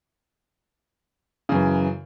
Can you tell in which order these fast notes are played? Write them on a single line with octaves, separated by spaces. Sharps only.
C#3 F#2 E3